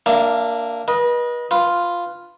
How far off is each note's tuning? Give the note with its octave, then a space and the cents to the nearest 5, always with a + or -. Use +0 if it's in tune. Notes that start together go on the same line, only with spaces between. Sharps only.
A#3 +0 D4 +0 E5 +30
B4 -35 D#5 +0
F4 +0 B4 +5